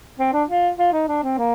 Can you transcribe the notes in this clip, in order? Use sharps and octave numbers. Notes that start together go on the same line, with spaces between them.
C4
D4
F4
F4
D#4
D4
C4
A#3